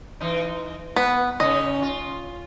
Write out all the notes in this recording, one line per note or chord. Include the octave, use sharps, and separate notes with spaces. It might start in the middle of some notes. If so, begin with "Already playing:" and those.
E3 D#4
B3 B4
C#3 C#4 D#4 D#5
F4